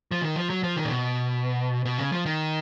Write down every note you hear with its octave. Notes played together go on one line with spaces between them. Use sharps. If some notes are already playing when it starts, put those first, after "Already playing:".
F3
D#3
F3
F#3
F3
D#3
A#2
B2
B2
C#3
F3
D#3